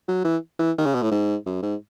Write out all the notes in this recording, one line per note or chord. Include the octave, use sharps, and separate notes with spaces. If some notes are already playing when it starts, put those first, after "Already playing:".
F#3
E3
E3
D#3
C#3
B2
A2
G#2
F#2
G#2